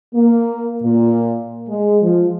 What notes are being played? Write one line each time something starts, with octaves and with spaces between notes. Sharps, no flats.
A#3
A#2
G#3
F3